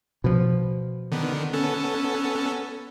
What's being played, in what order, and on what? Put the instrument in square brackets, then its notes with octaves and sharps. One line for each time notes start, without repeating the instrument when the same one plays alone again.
[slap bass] B2 F3
[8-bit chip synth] D3 D#3 B3
B3 C#4 A4